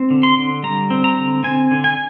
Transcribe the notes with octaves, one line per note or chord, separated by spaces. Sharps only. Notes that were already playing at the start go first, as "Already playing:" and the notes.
Already playing: C4
D3
C6
D3
G3 A#5
C4
A#5
D3
C4 G#5
D3
G#5